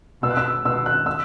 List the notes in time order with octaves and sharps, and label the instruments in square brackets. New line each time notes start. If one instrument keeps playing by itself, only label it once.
[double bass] B2 [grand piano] E6
[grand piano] F#6
E6
[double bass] B2 [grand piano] E6
[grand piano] F#6
E6